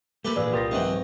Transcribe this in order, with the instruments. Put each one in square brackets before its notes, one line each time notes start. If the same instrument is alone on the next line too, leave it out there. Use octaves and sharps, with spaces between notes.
[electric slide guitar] A3 A#3 [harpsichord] G4 A4 B4
[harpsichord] A#1 [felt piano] E2 A#2 B4 [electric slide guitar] G#4 [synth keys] D5 F5 E6
[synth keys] C2 A#4 D#6 [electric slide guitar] F4 G4 [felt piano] C6 A6 A#6
[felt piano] G#2 C4 G5 [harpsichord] D#3 E3 F#3